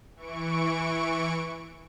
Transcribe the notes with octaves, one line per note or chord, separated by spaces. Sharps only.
E3 C#6 D7